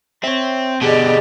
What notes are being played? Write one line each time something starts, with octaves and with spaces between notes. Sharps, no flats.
C4 C#5 E5
B2 D3 B3 G4 G#4 D5 D#5